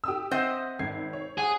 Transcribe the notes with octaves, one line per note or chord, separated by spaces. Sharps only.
G4 D#6 E6
C4 C5 D#5 E5 F#5
G#1 G#6 C7
C#5
G#4 F#5